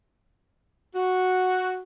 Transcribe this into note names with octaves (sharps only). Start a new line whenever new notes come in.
F#4